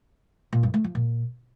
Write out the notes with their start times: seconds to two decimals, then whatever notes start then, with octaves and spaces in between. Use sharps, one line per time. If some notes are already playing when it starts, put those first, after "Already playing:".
0.53 A#2
0.63 G2
0.74 A3
0.84 F3
0.95 A#2